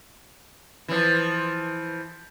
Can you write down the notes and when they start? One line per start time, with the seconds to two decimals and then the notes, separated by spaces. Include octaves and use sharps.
0.88 E3 F3